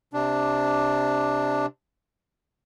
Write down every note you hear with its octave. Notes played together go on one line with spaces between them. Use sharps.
C3 D4